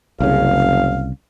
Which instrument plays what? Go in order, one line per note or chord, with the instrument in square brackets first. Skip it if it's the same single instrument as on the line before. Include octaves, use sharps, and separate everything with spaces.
[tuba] F#1 [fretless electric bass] C2 C#3 [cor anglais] F5